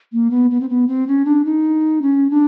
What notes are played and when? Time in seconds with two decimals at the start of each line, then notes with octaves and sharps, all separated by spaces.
0.13 A#3
0.31 B3
0.51 B3
0.61 C4
0.69 B3
0.88 C4
1.07 C#4
1.25 D4
1.45 D#4
2.02 C#4
2.30 D4